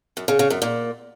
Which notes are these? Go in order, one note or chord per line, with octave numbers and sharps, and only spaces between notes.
F#2
C#3
C#3
F#2
A#2